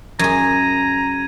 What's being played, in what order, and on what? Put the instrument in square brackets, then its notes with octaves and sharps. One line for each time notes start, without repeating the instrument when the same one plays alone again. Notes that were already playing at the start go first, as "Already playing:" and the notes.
[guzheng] F#2 G#4 [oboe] A#5 [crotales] G#6 D#7